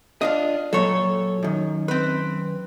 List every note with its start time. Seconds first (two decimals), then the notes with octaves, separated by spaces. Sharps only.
0.21 D4 F4 D#5 F5
0.73 A#2 F#3 A4 C#5
1.43 F#2 D#3
1.88 C4 B4